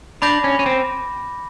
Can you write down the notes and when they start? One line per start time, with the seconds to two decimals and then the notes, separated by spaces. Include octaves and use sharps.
0.22 D4 B5 D6 G6 A#6
0.44 C#4
0.59 C#4
0.66 C4